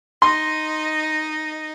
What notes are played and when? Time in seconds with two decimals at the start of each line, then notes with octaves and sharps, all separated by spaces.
0.22 D#4 D#5 C6